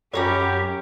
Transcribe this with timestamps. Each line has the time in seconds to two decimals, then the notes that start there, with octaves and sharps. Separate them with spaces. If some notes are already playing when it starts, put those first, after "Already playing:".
0.13 F#2 C#4 G4 C#5 A#5 B5